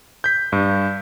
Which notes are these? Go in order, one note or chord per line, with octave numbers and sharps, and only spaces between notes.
G6 B6
G2